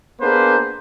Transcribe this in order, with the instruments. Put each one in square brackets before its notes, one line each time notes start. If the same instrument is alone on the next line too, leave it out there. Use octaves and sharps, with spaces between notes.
[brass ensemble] A#3 B3 D4 G#4 B4 C5